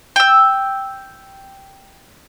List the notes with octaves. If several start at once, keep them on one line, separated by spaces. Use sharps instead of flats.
G5 E6